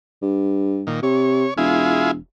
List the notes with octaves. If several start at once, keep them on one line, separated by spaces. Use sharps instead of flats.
G2
A#2 D#3
C3 C#5
E1 E4 F4 G#4